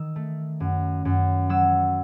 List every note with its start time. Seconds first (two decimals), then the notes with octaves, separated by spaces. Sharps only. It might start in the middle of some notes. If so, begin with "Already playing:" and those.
Already playing: D#3 E6
0.16 A3
0.60 F#2
1.05 F#2
1.49 F#3 E6